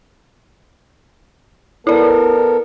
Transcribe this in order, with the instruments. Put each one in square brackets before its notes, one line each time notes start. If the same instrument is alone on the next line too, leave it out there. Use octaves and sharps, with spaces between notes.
[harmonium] B3 A4 A#4 [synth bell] E4 D5